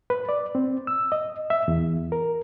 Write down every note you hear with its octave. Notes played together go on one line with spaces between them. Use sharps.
B4
D5
C4
E6
D#5
E5
E2
A#4